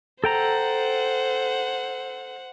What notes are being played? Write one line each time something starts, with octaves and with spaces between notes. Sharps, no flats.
A4 C5 F#5 G5 A#5